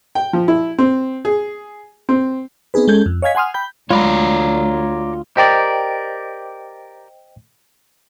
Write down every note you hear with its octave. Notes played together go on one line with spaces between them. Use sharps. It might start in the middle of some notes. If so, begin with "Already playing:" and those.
G5
F3
E4
C4
G#4
C4
B3 C4 D#4 G#4 B4
G#3 C#4 A4 G6 G#6
F2
C#5 D#5 F5 G#5 G#6 B6
F#5 G#5 C6 D#6 F6
G5 B5 G6
D2 F#3 G#3 F4 C#5 D5 A#5 B5
G4 A#4 C5 D5 D#5 G5